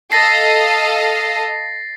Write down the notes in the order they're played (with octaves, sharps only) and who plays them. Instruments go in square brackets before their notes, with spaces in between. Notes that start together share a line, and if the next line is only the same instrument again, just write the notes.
[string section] A4 D#5 F5 [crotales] A6 A#6 C7